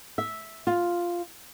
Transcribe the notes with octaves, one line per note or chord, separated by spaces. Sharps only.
E5
F4